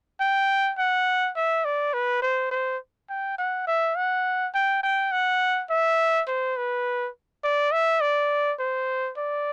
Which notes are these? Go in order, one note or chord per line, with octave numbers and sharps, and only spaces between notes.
G5
F#5
E5
D5
B4
C5
C5
G5
F#5
E5
F#5
G5
G5
F#5
E5
C5
B4
D5
E5
D5
C5
D5